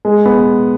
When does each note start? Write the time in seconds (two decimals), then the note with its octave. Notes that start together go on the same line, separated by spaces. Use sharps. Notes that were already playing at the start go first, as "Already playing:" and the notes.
0.05 G#3
0.26 B3